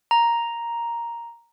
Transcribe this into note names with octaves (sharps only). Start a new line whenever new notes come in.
A#5